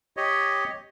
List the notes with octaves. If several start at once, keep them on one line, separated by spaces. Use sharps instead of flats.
G4 C#5 D#5